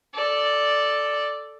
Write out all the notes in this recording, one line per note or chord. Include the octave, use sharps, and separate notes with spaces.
A4 D5